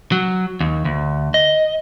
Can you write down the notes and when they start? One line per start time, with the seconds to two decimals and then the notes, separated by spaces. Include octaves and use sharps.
0.12 F#3
0.60 D#2
0.85 D2
1.34 D#5